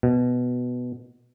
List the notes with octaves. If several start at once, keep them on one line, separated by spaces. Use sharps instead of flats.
B2